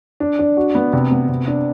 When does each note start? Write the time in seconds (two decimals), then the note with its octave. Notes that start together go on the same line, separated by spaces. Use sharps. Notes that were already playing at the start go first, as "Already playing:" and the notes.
0.20 D4
0.39 D4
0.57 F#4
0.75 B3
0.93 C3
1.11 B3
1.29 C3
1.47 D4